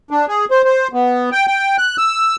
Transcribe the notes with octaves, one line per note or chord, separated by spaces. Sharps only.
D4
G#4
C5
C5
B3
G5
G5
F#6
E6